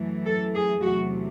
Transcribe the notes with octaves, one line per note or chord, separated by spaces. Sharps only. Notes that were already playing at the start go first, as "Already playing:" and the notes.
Already playing: F#2 E3 A3
A4
G#4
E2 C3 F#3 A3 F#4